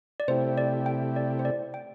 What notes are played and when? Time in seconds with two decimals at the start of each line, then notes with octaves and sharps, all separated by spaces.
0.20 D5
0.28 C3 A3 E4 G4 C5
0.58 D5
0.86 G5
1.16 D5
1.39 C5
1.45 D5
1.74 G5